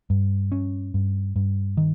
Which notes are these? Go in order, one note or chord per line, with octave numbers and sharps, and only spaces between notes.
G2
C#4
G2
G2
D#3